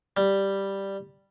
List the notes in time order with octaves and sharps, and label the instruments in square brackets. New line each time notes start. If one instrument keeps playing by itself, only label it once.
[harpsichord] G3